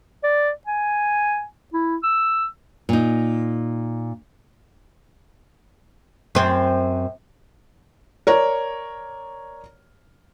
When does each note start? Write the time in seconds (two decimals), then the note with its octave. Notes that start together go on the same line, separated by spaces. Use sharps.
0.23 D5
0.67 G#5
1.73 E4
2.03 E6
2.89 A#2 D#4
6.35 F#2 C4
8.27 A#4 C#5 D5